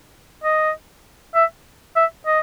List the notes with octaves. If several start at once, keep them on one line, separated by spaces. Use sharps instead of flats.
D#5
E5
E5
D#5